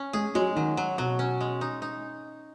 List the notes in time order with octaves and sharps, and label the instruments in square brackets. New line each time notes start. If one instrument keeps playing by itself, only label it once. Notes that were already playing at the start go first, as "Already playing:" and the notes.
Already playing: [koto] C#4
[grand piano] G#3 [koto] G#4
[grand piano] F#3 [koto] G#3
[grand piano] D#3 [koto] F#3
[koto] F#3
[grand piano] B2 [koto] F#3
[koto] C#4
G#3
D#4
D#4